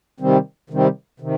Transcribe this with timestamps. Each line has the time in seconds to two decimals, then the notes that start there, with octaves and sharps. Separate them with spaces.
0.20 C3 D#3 G3 C4
0.70 C3 D#3 G3 C4
1.20 C3 D#3